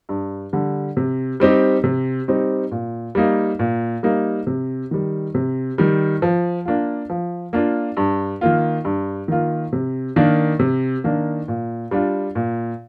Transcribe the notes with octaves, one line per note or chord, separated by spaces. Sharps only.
G2
D3 G3
C3
G3 C4 D#4 G4
C3
G3 C4 D#4 G4
A#2
G3 A#3 D#4
A#2
G3 A#3 D#4
C3
D#3 G3
C3
D#3 G3
F3
A#3 D4 F4
F3
A#3 D4 F4
G2
D#3 A#3 F4
G2
D#3 A#3 F4
C3
D#3 A#3 D4
C3
D#3 A#3 D4
A#2
G3 D4 F4
A#2